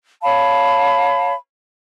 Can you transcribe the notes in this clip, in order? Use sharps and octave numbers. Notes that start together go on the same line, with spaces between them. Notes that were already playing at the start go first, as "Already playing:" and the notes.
C#5 F5 A5 B5